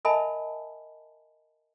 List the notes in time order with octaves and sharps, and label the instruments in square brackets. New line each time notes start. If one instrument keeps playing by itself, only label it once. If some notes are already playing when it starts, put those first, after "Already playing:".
[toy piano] A#4 D#5 E5 G#5 A5 B5